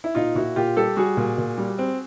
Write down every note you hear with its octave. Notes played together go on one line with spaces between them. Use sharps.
E4
A#2 D#4 F4
A#2 E4 F#4
A#2 F4 G4
G3 G4 A4
G3 F#4 G#4
A#2
A#2
G3
C4